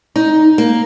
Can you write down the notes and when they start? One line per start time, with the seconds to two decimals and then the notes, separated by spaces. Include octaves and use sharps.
0.16 D#4
0.58 A#3